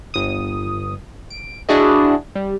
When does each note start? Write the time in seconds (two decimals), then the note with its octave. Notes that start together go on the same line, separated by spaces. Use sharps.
0.14 G1 D#6
1.30 D7
1.69 D4 E4 F#4 G#4 D#5
2.35 G3